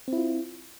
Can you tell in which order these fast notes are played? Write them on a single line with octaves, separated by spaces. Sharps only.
C4 E4 F4